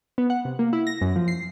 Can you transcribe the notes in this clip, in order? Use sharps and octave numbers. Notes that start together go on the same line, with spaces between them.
B3
F#5
C3
A#3
E4
A#6
F#2
F3
C7